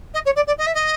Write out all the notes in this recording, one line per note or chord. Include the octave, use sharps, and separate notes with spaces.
D#5
C#5
D5
D5
D#5
E5
D#5